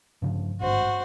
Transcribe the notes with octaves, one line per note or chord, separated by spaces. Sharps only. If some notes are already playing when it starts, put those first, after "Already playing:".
G2 C#3 F3
G#1 G2 F#4 C5